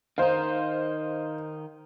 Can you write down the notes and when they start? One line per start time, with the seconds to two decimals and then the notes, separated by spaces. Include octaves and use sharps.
0.18 D#3 D#4 C5 F5